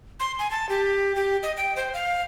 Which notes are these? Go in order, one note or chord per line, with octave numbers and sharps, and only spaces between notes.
C6
G#5
A5
G4
G4
D#5
G5
C5
F5